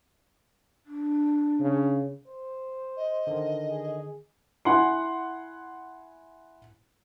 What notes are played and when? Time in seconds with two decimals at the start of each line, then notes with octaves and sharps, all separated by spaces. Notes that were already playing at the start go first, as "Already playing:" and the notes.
0.86 D4
1.60 C#3
2.27 C5
2.96 D#5
3.27 D3 D#3
3.68 G#4
4.65 E4 F#5 G#5 C6